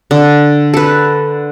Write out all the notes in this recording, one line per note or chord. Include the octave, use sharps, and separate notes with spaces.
D3
A4 B4